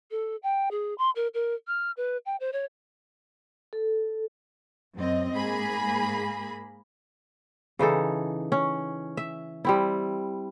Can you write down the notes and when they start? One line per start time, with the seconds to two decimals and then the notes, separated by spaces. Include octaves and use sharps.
0.11 A4
0.43 G5
0.71 G#4
0.98 C6
1.16 A#4
1.34 A#4
1.67 F6
1.97 B4
2.26 G5
2.40 C5
2.53 C#5
3.73 A4
4.96 F#2 C4 D#5
5.35 G#2 A#3 G#4 B5
7.79 C#3 E3 D#4 A4
8.52 C#4
9.17 E5
9.65 G3 C4 E4